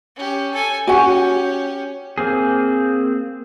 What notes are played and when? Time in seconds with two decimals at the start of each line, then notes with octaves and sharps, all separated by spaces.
0.16 C#4 G4
0.53 A4 G#5
0.87 C#4 F#4 G4 G#5
2.18 A#3 C4 G#4